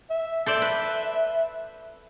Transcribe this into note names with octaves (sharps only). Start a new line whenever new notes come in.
E5
A4 C5 D5
B4